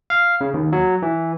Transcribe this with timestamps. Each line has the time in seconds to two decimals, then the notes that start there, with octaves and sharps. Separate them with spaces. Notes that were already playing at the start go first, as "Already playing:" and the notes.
0.10 F5
0.41 C#3
0.54 D#2
0.72 F#3
1.02 E3